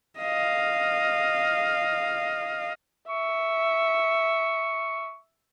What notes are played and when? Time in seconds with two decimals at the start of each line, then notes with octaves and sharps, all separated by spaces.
0.19 D#5 F5
3.09 E5 C#6